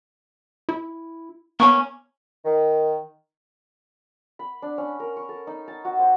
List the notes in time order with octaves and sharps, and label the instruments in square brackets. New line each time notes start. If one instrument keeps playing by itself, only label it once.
[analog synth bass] E4
[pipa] A#3 C#4 [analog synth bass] B3 [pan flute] C#6
[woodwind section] D#3
[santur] B5
D4
C#4
A#4
C#6
A4
D#4
A5
F#4
C5